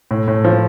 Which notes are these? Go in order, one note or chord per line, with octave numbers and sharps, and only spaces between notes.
A2
A2
F3